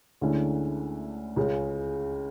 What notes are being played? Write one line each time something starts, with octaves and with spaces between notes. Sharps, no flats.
D2 D3 G#3 C#4 E4
C#2 C#3 G#3